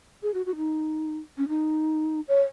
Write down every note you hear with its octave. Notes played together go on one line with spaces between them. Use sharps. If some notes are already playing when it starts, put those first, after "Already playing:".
G#4
F#4
F#4
D#4
C#4
D#4
C#5